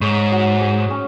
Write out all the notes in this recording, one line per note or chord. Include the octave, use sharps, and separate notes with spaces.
G#2 C#5
F#3
G#4
C#4